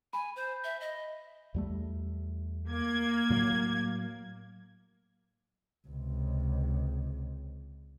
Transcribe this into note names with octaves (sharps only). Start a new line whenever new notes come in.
G#5 B5
C5
E5
D#5
E2 G3 A3
A#3 G#6
A2 F#3
C#2 C3